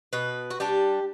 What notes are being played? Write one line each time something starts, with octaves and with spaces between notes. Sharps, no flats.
B2 B4
F#4
G3 D4 G4